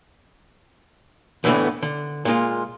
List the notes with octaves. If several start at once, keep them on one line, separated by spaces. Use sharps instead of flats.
D2 A2 D3 E3 A3 B3
D3
A#2 G#3 F4